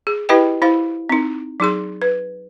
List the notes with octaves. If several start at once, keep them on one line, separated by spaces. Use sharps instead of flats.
G#4
E4 G4 B4 D#5 G5
E4 C5 F5
C4 D#4
F#3 D#4 G#4 C6
B4